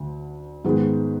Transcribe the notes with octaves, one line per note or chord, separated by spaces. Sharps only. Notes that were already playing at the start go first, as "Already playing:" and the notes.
Already playing: D2 D3
G#2 D#3 G#3 B3